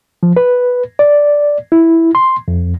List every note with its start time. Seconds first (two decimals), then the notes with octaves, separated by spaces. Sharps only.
0.23 F3
0.37 B4
0.99 D5
1.72 E4
2.15 C6
2.48 F2